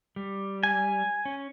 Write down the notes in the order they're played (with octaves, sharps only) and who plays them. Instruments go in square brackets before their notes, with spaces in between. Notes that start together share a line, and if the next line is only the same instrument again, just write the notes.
[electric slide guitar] G3
[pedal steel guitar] G#5
[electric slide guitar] C#4